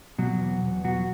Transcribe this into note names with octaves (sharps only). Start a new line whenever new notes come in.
B2 F#3 F#4
E2
E2
B2 F#3 F#4